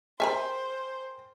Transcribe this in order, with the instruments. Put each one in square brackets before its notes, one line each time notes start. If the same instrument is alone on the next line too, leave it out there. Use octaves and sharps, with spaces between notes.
[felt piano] G#4 A#4 G5 [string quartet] C5 [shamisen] E5 G#5 B5